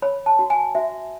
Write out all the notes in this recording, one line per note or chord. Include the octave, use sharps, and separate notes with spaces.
C#5 B5
A5
F#4
G#5
F#4 E5